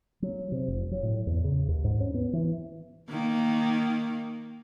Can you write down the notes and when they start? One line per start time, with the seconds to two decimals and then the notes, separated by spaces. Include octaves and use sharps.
0.22 F#3
0.52 C3
0.68 F1
0.91 F#3
1.03 A2
1.27 E2
1.44 C#3
1.68 D#2
1.84 G#2
2.00 C#4
2.14 B3
2.33 E3
3.09 D#3 A#3